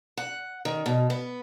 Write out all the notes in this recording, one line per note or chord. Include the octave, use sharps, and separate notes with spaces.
F#5
D#3
B2
B3